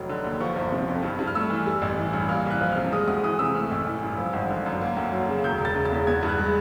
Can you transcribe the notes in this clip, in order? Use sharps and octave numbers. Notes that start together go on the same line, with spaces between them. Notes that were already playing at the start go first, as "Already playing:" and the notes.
Already playing: F1 F#3
D3
D#2
F3 C#6
G1
C3
F2
G2
G2
F6
A3 E6
E3
G3
A1
E3
G2
A#3 F6
C2
F#6
F3
C3 F6
G#3 D#6
D2 D#6
E3 D#6
C3 E6
A3 F6
A1
E3
G2
F3
G#1
D3
F#2
A#3
D2
F#3
C#3
E1 G6
E1 A6
C#3
A6
E2
B3 G#6
G2
F#6
G#3